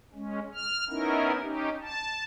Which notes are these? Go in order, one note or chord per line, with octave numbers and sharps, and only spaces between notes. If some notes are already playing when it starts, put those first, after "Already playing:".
G#3 C#4
F6
B3 C#4 D#4 E4 A#4
C#4 D#4 G4
A5